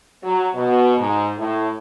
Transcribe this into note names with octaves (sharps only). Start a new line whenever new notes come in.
F#3
B2
G#2
A2